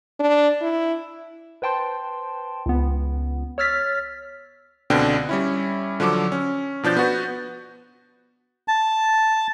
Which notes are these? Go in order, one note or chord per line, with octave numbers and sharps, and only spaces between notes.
D4
E4
B4 C5 G5 A5 C6
C#2 B3
C#5 E6 F6 A6 B6
C#2 B2 D3 C4 D4 G5
G3 C#4 E4
D3 F3 F#3 A4 D6
C#4
B2 F3 D4 G6 A6
B3 F#4 B4
A5